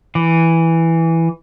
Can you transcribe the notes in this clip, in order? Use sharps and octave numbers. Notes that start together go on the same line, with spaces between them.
E3